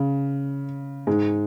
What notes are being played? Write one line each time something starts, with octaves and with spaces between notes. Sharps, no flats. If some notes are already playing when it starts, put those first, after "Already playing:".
Already playing: C#3
G#2 G#3